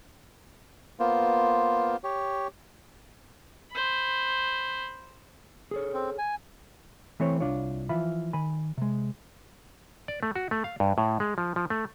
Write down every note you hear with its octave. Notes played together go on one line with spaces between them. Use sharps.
A#3 B3 F4 C5
G4 C#5
C5 B5
G#4 A4 C#5
C4
G#5
E3 A3 C4 C#5
C2 D4 F4 C#5
E3 F3 F4 E5 B5
D#3 G#5 B5
C3 G#3
D5
A3
F#4
A3
F5
G2
A2
G#3
F3
F3
A3